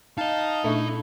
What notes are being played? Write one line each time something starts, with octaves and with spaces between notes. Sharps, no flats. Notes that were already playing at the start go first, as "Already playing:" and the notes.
D#4 D#5 F5 A5
A#2 A3 D4 E4 C#6